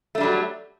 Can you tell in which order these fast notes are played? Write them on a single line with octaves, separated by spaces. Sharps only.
A3 D4 G3 F#3